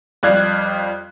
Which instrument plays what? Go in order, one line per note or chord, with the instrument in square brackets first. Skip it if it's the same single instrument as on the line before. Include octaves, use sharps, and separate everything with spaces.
[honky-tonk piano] F2 G3 D5 F5 F#6 G#6